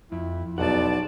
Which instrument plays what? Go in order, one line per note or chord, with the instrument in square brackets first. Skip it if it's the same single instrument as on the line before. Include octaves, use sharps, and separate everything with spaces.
[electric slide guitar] F2 [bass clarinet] E4
[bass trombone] B1 [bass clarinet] E2 [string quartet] D5 A5 [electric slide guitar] F#5